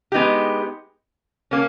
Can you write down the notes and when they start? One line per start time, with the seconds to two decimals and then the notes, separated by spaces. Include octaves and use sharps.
0.12 G#3 B3 D#4 G4
1.51 A#3 C#4